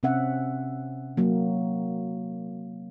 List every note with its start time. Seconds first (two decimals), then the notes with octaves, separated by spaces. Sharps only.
0.03 C3 C4 C#4 E5 F#5
1.17 F#3 A#3